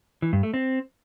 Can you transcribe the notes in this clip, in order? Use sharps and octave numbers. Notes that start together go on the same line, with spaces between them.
E3
G2
A3
C4